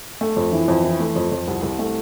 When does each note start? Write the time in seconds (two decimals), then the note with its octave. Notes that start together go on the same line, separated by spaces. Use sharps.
0.21 A3
0.37 F2
0.52 E3
0.68 F2
0.84 E3
1.00 A3
1.16 F2
1.32 F2
1.48 C2
1.63 C2
1.79 A3